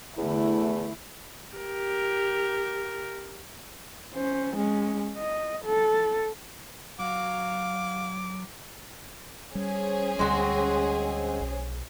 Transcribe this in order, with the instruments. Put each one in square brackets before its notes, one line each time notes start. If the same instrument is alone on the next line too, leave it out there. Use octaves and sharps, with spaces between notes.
[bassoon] E2 [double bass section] D3 A3 [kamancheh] E4
[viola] G4 A#4
[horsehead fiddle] C#4 C5
G#3 C#4
D#5
A4
[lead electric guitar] F#3 [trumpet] F5 [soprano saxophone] D6
[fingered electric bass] G3 [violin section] C#4 G#4 C5
[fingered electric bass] D2 G3 [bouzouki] G#3 C4 F#4
[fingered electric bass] B1